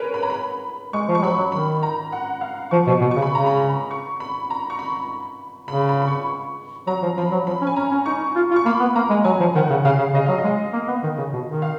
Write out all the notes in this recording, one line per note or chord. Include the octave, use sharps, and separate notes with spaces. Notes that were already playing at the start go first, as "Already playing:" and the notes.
Already playing: G#4 A#4 B4 C#5
B5
A#5
B5
G#3 C#6
F3
C#6
G#3
F#3 B5
F#3
D#3 B5
A#5
F#5
F5
F3 C#6
B2
C#6
B2
C#3 C#6
B5
C#3 A#5
B5
C#6
B5
A#5
C#6
B5
C#3 B5
B5
B5
C#6
F#3 A#5
F3
F3 B5
F#3
F3 B5
C#4
G#5
C#4 A#5
C#4
D#4 C#6
F4
F4
C#6
A#3 B5
B3
A#3 A#5
G#3
F#3 G#5
F3
G#5
D#3 F#5
C#3
C#3 F5
C#3
C#3 D#5
F#3 F5
D#5
G#3
A#3
B3
D#3
C#3
B2
D#3
F5